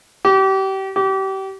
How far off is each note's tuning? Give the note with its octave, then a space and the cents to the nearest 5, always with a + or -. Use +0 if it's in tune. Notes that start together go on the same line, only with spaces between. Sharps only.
G4 -30
G4 -30